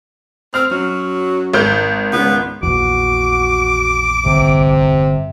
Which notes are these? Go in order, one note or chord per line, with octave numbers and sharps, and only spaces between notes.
C4 F6
F#2 F#3
G#1 G6
C#2 B3
A#1 E2 F#4 D6
G1 C3